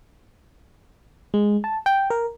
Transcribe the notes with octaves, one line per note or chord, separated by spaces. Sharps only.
G#3
A5
G5
A#4